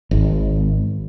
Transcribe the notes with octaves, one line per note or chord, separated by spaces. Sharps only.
G#1